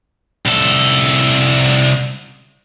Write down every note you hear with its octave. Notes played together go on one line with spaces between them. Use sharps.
C2 A4